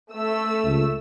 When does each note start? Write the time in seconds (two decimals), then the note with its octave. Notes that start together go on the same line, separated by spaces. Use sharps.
0.12 A3 E6
0.65 C#2